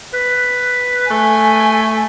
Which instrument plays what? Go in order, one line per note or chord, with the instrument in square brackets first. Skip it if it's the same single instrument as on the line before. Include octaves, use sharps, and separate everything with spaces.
[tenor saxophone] B4
[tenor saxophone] A3 [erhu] G#5